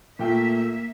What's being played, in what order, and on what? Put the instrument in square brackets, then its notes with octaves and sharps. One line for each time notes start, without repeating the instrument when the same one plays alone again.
[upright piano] A#2 A3 G5 [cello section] A#3 E5